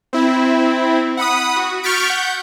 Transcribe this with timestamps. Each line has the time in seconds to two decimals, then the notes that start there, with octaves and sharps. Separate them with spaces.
0.13 C4 E4
1.17 F#5 B5 D#6
1.56 F#4
1.83 C#6 F6 G6 A6 B6 D7
2.08 F#5 G6